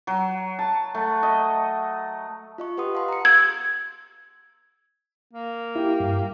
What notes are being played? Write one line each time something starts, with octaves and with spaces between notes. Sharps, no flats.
F#3
A5
A3
D#5
F4 D#5 C#6
G4 B4 F#5 C6 D#6
F5 F#5 A5 C6
A#5 C#7
E6 G#6
A#3
E4 G4
G2